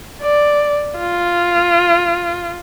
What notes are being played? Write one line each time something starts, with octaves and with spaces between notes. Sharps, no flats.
D5
F4